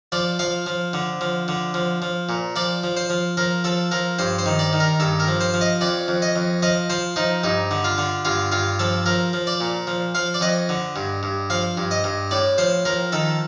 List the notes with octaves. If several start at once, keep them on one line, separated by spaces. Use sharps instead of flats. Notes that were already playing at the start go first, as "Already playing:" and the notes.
F3 D5
F3 F5
F3
D3
F3
D3
F3
F3
A#2
F3 D5
F3
C5
F3
F3 A#4
F3 A4
F3 A#4
G2 C5
C5
D#3
D5
D#3
A#4
G2 A4
A#4
F3
C5
F3
D#5
F2 D5
F2
D#5
F2
F3 D#5
F3 C5
F3 D#4
G2 D#4
D3
F4
D3
G2 F4
G2 F4
F3 A4
F3 A#4
F3
D5
A#2
F3
F3 F5
D5
F2 D#5
D3
G2
G2
F3 F5
G2
D#5
G2
A2 D5
F3 C5
F3 A#4
D#3 A4